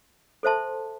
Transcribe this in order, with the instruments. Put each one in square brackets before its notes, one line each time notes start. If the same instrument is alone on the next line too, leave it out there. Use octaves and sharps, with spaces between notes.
[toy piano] A4 C5 E5 A5 C6